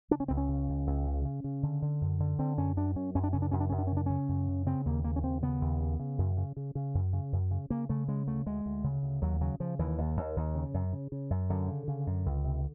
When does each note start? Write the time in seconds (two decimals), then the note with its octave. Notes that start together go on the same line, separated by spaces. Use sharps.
0.11 C#3 D4
0.20 C#4
0.28 C#2 C4
0.37 C#4
0.49 C#3
0.68 C#2
0.87 C#2
1.06 C#3
1.25 C#3
1.44 C#3
1.63 D3
1.82 D3
2.01 F#2
2.20 D3
2.39 D3 C4
2.57 F#2 C#4
2.77 F#2 D4
2.96 F#2 C#4
3.15 F#2 C#4
3.24 D4
3.33 C#3 C#4
3.42 D4
3.51 F#2 C#4
3.60 D4
3.70 F#2 C#4
3.78 D4
3.87 C#3 C#4
3.97 D4
4.06 C#3 C#4
4.28 F#2
4.48 C#3
4.66 C#3 C4
4.86 D#2 A#3
5.04 C#3 A#3
5.16 C#4
5.23 D#2 C4
5.42 C#3 B3
5.61 D#2
5.81 C#3
6.00 C#3
6.18 F#2
6.37 C#3
6.57 C#3
6.75 C#3
6.95 F#2
7.13 C#3
7.32 F#2
7.51 C#3
7.70 C#3 A#3
7.89 C#3 A3
8.08 C#3 G#3
8.27 D2 A3
8.46 D2 G#3
8.66 D2
8.84 C#3
9.03 D2
9.22 D#2 F#3
9.41 C#3 F#3
9.60 C#3 F3
9.79 D#2 E3
9.98 D#2
10.17 D#2
10.36 D#2
10.55 C#3
10.74 F#2
10.93 C#3
11.12 C#3
11.30 F#2
11.50 F#2 D3
11.68 C#3
11.88 C#3
12.07 F#2
12.26 C#2
12.45 C3